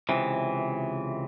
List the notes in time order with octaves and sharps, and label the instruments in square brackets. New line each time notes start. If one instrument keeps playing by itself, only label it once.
[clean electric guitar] C#2 C3 E3